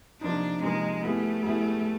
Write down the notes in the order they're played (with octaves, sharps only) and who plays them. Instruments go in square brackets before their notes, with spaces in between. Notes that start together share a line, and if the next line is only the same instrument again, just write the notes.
[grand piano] C3 F3 A#3 D#4 [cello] D4
[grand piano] C3 F3 A#3 D#4 [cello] G#3
[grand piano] G3 B3 E4 G#4 [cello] A3
[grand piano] G3 B3 E4 G#4